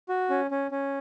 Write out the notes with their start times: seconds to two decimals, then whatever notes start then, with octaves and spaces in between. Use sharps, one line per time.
0.09 F#4
0.30 C#4
0.51 C#4
0.71 C#4